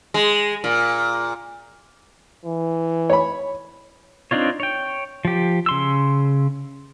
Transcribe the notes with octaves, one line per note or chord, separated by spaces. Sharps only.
G#3
A#2
E3
C#5 B5
C4 D4 D#4 F4 C#5
C#5 G5
F3 G4
C#3 C6 E6